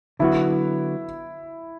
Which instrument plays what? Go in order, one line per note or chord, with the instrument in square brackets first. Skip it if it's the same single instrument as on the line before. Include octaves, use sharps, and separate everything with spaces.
[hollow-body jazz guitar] D3 F#3 B3 F#4 [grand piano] E4